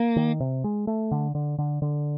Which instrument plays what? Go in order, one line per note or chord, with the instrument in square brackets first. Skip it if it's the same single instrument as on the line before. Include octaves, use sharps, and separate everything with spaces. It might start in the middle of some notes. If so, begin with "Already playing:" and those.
Already playing: [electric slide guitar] A#3
[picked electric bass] D#3
C3
G#3
A3
D3
D3
D3
D3